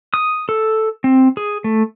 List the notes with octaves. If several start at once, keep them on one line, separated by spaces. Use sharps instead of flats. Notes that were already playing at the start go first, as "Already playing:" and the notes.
D#6
A4
C4
G#4
A3